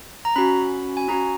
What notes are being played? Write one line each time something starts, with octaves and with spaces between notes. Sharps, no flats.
A#5
C#4 F#4 B5
G#5
C#4 F#4 A#5